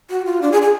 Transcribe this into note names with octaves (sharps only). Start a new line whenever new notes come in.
F#4
F4
D4
G#4
G#4